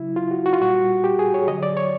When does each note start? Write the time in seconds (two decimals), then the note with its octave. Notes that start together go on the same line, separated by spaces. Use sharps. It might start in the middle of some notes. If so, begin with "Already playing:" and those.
Already playing: C#3 F#3 E4
0.16 F4
0.31 F#4
0.46 F#4
0.53 F4
0.61 A#2 G3 F#4
1.04 G4
1.19 G#4
1.34 C#5
1.48 D3 D#5
1.52 F#3
1.63 D5
1.77 C#5